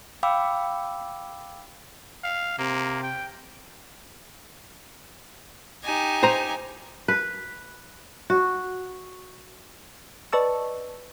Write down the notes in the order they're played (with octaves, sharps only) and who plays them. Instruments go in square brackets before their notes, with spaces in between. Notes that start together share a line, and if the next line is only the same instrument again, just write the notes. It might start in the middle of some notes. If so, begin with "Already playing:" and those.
[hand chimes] F5 G5 B5 D6 E6
[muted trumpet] F5
[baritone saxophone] C3 [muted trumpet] A#3
[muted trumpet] G5
[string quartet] D#4 G4 G#5
[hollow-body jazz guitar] C5 A#5
[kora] B4
F#4
[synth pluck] B4 D5 D#5 A5 C#6 E6